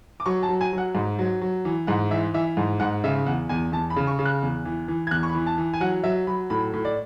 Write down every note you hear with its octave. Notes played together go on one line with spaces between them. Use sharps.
D6
F#3 C#6
A5
F#3
G#5
F#3
F#5
G#2
F#3
F#3
E3
G#2 F#5
E3 E5
E3 E5
G#2
G#2 F#5
C#3 E5
E2 F#5
E2 G#5
E2 A5
B5
C#3
C#6
C#3
F#6
E2
E3
E3
G#6
E2 F#6
C#6
B5
E3
A5
E3
G#5
F#3 F#5
F#3 E5
F#3 B5
A2 B5
A2
D5